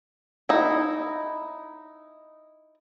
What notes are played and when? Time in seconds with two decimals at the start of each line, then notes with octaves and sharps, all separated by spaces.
0.49 D#4 E4